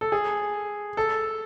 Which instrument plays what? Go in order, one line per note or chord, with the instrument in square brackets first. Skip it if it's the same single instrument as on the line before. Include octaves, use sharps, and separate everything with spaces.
[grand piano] A4
G#4
A4